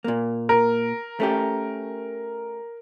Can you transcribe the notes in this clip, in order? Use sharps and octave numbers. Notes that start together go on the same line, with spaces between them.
A#2 A#3
A#4
A3 C#4 G4